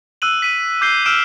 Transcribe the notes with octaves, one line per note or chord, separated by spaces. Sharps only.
E6 F#6 D#7 F#7
B6 D#7
D6 G6 C7 G7
E6 F6 D7 E7